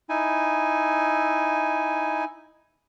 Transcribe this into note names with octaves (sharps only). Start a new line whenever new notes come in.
D#4 E4 G#5